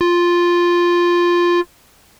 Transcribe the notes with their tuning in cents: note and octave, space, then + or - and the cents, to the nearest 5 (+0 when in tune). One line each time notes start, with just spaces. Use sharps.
F4 +0